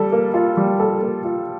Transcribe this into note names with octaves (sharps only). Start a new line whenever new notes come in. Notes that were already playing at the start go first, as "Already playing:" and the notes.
Already playing: G3 A4
A#3
F4
G3
A4
A#3
F4